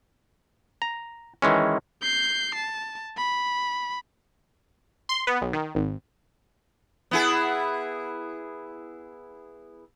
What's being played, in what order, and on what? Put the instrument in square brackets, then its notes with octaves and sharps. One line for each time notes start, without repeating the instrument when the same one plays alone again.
[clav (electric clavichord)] A#5
D#3 E3 G#3 C#4
[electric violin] G6 C7
A5
B5
[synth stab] C6
B3
B1
D#3
G#1
[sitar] B3 E4 G#4